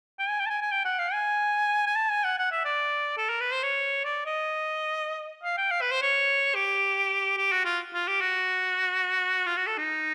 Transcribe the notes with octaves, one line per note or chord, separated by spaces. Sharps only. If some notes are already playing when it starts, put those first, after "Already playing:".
G5
G#5
G5
A5
G#5
G#5
G5
F#5
F5
G#5
G#5
A5
G#5
F#5
F#5
E5
D5
A4
A#4
B4
C5
C#5
D5
D#5
F5
G5
F5
B4
C5
C#5
G4
G4
F#4
F4
F4
G4
F#4
F4
F#4
A4
D#4